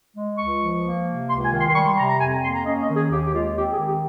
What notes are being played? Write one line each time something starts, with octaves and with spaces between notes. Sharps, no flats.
G#3
C#2 C#6
F3
A#3
C3
C#2 C6
G#5
D#3
C6
C6
G3 C#6
C6
C3 A#5
A#5
F2 G#5
A#5
A#3 C6
A#5
C#4 D#5
D#5
D#3
G#4
D#2 G4
G4
G#3 F4
C4 G4
G#4
D#3
G4